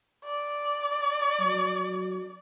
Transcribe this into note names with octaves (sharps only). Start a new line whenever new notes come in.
D5
F#3